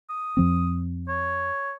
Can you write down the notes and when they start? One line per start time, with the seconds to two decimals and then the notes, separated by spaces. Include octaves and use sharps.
0.10 D#6
0.37 F2 F3 C4
1.08 C#5